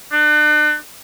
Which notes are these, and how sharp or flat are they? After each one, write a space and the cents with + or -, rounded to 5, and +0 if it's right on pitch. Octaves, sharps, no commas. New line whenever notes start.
D4 +40